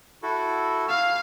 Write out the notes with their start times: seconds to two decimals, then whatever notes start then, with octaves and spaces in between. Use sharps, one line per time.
0.23 E4 F#4 A4
0.89 F5